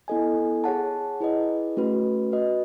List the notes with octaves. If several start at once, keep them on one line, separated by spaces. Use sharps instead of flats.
B3 E4 A4 D#5 G#5
G#4 C#5 F#5 A5
E4 G#4 B4 D#5
A3 C#4 F#4 B4 D#5
F#4 B4 D#5